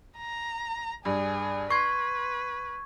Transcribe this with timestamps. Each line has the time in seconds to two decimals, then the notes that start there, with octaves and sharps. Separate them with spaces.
0.18 A#5
1.05 G2 G#4
1.70 B4 C6 C#6 G#6 C7